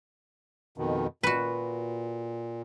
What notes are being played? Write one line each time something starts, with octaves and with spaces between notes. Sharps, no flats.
F2 B2 D#3
A#2 F#4 B4